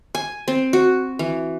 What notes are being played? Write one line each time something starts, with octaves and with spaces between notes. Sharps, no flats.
G#5
C4
F#4
E3